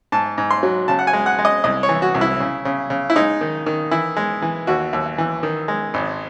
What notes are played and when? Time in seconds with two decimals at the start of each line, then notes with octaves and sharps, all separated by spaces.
0.12 G#2 A5
0.38 G#2
0.51 C6
0.63 F#3
0.88 C#3 A5
0.99 F#5
1.07 G#5
1.13 G#3
1.26 F#5
1.39 G#3
1.45 D#5
1.64 C2 D#5
1.83 C#5
1.89 E3
2.02 F#4
2.15 C2
2.21 E4
2.40 C#3
2.65 C#3
2.90 C#3
3.10 E4
3.16 G#3 D#4
3.41 D#3
3.66 D#3
3.91 E3 E4
4.16 G#3
4.42 E3
4.67 D#2 F#4
4.93 D#2
5.18 E3
5.43 D#3
5.68 G#3
5.94 G#1